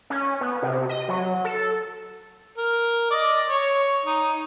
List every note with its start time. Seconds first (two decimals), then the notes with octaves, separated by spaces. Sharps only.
0.10 C#4
0.41 B3
0.62 C3
0.89 D#5
1.09 F#3
1.45 A4
2.58 A#4
3.11 D5 D#5
3.49 C#5
4.05 D#4